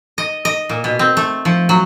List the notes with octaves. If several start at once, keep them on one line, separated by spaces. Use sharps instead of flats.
D#5
D#5
A#2
B2
C4
A3
F3
F#3